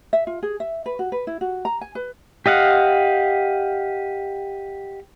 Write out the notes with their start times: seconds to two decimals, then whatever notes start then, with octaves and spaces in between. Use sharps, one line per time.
0.13 E5
0.27 F4
0.43 G#4
0.60 E5
0.86 B4
0.99 F#4
1.12 B4
1.27 E4
1.41 F#4
1.65 A#5
1.81 G#5
1.95 B4
2.46 G4 D#5 F5 F#5